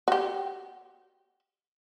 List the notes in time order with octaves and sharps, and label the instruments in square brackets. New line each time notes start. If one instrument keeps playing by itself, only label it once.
[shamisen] F#4 G4